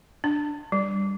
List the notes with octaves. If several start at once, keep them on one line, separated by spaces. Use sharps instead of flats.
D4
G3